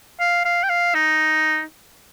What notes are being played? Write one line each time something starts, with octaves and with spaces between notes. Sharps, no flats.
F5
F5
G5
F5
D#4